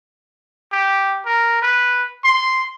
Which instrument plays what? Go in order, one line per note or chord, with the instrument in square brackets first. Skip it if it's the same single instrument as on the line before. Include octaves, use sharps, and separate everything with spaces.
[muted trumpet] G4
A#4
B4
C6